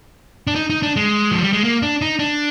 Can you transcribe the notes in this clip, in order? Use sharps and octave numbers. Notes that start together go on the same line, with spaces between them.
D4
D#4
D#4
D4
G#3
F3
G3
G#3
A#3
D4
D#4
D4